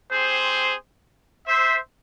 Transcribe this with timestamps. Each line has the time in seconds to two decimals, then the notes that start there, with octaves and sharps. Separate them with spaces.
0.11 C4 G4 G#4 C5
1.46 C5 E5